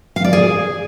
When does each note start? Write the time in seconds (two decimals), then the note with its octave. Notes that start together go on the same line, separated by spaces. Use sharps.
0.16 F5
0.24 D5
0.33 G#4